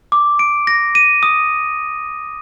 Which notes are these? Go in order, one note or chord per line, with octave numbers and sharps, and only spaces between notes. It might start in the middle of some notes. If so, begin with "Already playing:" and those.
D6
D7
A#6
D#7
D#6